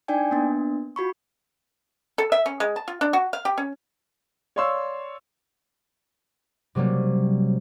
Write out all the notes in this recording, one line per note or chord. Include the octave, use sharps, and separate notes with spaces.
D4 D#4 D5 G5 G#5
A#3 B3 D4
F4 F#4 B5 C#6
A4
E5
C#4
G#3
A5
F4
D4
F#4
F5
G4
C#4
C#5 D5 F5 C6 C#6 E6
C3 F#3 G3 A#3 C#4